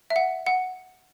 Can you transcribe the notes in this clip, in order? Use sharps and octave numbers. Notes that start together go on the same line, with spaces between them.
E5
F#5
F#5